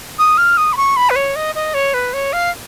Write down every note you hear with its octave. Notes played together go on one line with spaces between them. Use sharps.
D#6
F6
D#6
B5
C#6
B5
B4
C#5
D#5
D#5
C#5
B4
C#5
F5